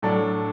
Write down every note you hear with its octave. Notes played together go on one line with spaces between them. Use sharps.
A2 F#3 D4 A4